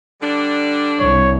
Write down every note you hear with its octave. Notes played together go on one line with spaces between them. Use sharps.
D3 G3 D4
C2 C#5